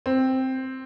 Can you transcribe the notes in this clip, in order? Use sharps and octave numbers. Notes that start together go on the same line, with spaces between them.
C4